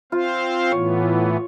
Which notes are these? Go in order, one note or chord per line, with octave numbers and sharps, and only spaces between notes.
C4 F4 C5 F5
A2 E3 B3 C#5